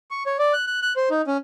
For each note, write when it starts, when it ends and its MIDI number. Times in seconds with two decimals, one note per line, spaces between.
0.11 0.23 85
0.26 0.37 73
0.39 0.53 74
0.53 0.66 90
0.67 0.80 90
0.82 0.93 90
0.96 1.09 72
1.10 1.22 63
1.27 1.37 61